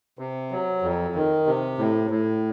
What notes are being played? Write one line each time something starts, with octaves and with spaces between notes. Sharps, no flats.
C3
F#3
F2
D#3
C3
A2
A2